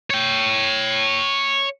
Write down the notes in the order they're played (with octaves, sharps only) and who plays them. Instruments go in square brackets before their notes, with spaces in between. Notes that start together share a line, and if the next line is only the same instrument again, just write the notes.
[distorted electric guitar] C#5 G5